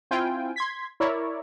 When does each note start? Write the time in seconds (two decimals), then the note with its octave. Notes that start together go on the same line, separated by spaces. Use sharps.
0.11 C4 E4 F4 G5 G#5
0.56 C6 G#6 B6
1.00 E4 A#4 C#5 D5